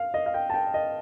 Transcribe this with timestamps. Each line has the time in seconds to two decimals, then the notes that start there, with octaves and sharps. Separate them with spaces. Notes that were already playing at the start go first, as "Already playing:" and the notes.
Already playing: F5
0.14 D#5
0.26 F5
0.34 G5
0.50 A5
0.54 G5
0.74 D#5